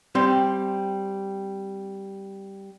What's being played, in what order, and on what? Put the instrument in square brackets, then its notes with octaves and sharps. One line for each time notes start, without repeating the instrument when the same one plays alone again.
[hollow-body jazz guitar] G3 C4 C6